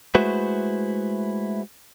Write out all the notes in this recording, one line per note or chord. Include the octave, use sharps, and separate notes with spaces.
G#3 A3 E4 F#4 B4 C5